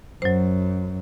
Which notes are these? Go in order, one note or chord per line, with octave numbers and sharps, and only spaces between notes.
F#2 F#3 C5